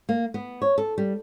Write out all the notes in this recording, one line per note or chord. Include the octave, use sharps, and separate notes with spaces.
A#3
B3
C#5
A4
G3